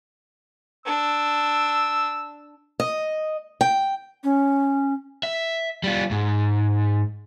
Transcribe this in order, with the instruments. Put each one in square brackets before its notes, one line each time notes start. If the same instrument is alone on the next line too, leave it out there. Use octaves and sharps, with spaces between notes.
[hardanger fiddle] D4 [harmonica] E6
[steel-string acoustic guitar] D#5
G5
[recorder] C#4
[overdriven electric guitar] E5
G3 F4
G#2